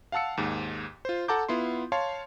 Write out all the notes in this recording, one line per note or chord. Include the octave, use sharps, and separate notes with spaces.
F5 F#5 A5 E6 C#7
D#2 G#2
F4 C5
A4 F#5 A5 A#5 D6 G6
B3 E4 F4 C6
C#5 F5 A5 C6